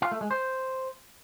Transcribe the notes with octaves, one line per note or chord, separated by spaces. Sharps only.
F4
A3
G#3
C5